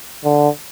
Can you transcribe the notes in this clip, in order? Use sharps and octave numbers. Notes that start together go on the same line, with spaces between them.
D3